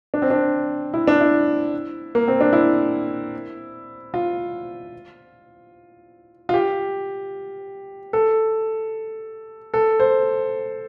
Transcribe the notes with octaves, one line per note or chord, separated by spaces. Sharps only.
D4
C4
D4
E4
D4
E4
A#3
C4
D4
E4
F4
F4
G4
A4
A4
C5